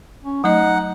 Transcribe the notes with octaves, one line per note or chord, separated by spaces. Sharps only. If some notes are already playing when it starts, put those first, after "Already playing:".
C#4
F#3 A3 D#4 D#5 F#5